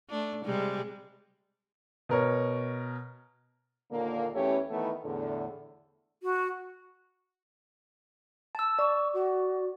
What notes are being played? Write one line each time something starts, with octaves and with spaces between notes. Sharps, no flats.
A3 D4
C3 G3 G#3
B2 A#4 C#5
D#2 A#2 D3 A#3
E2 E3 A3 C#4 G4 C#5
D#3 E3 A3 B3
E2 A2 D3
F#4
A5 E6
D5 C#6
F#4